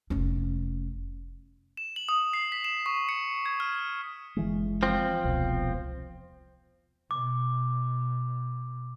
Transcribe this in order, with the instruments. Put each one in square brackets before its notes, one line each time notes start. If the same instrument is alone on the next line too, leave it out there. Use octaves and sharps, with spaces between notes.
[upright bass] F1 C#4
[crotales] E7
F#7
D#6
C7
B6
E7
C#6
C#7
G#6
F6
[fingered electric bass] F#1 E3 G#3
[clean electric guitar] F3 C4
[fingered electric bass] E1 C2 B2
[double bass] B2 [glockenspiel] D6